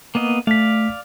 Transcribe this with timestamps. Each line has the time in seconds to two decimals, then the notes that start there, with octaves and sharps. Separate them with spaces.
0.15 A#3 B3 D#5
0.47 A3 D5 F5 B6